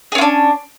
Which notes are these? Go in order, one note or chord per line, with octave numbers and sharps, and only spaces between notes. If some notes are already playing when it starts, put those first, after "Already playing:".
C#4 D4 F4 G#4